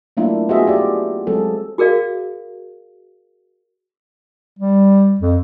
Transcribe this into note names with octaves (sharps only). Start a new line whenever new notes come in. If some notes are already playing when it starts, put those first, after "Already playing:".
F#3 A3 A#3 D4 E4 F4
B3 F4 F#4 G#4 D#5 E5
G4 D5
F#3 G#3 C4 G#4 A4
F#4 G#4 A#4 D5 F5
G3
F2